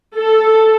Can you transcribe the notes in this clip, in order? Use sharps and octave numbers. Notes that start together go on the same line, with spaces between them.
A4